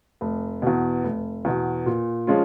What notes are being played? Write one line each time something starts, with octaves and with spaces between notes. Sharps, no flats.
F1
E2 B2
F1
E2 B2
A#2
F3 G#3 C#4 F4